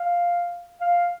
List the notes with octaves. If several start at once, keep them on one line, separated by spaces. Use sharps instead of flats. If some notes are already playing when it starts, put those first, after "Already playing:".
Already playing: F5
F5